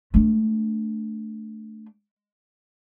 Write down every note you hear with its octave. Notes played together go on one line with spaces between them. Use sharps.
A3 D4